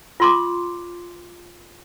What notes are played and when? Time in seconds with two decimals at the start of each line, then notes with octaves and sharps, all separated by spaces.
0.20 F4 C6 D6